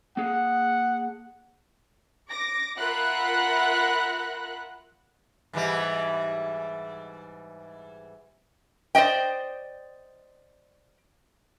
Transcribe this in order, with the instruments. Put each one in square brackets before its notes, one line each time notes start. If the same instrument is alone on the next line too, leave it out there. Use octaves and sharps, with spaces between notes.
[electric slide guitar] A#3 G#4 [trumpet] F#5
[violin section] D6 A#6
F4 A#4 E5 F#5 B5 F#6
[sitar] G#2 E3 G3
[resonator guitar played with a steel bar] C5 D5 D#5 G5